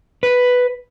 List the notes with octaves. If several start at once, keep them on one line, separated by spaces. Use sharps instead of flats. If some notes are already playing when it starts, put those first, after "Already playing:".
B4